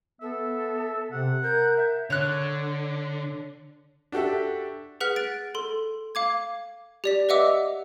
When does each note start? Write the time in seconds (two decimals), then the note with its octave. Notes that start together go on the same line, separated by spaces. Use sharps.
0.21 B3 A4 E5
1.12 C3 F#5
1.43 A#4 G6
1.76 E5
2.10 D3 C#5 F#6
4.12 D4 F#4 G4 A4 E5
5.00 G#4 B4 F#5 F6 F#6 B6
5.16 A6 D7
5.55 A4 C6
6.15 F5 D6 G#6
7.04 G4 D5 B6
7.29 B4 D#5 E5 F#5 D6 E6